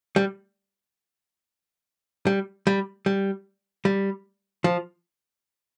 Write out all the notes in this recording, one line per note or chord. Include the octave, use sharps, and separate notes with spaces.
G3
G3
G3
G3
G3
F3